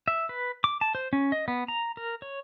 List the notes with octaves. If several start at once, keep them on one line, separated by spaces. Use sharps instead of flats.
E5
B4
D6
A5
C5
C#4
D#5
B3
A#5
A#4
C#5